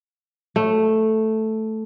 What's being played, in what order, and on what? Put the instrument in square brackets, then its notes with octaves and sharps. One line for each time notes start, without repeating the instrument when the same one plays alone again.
[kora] A3